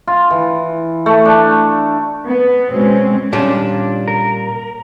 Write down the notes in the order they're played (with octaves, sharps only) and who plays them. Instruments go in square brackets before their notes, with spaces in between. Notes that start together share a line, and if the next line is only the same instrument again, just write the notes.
[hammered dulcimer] F4
E3
A3
D4
[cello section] B3
B2 G#3 C4 C#4
[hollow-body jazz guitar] A#2 G3 C#4 [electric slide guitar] D4
[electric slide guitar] A#4